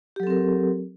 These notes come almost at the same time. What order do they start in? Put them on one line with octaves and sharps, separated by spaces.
G4 F#3 A4 C4 A#4